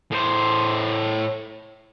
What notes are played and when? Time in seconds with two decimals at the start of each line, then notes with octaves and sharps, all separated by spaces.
0.12 A2 C5